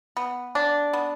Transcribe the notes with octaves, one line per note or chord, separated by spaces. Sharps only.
B3
D4
B3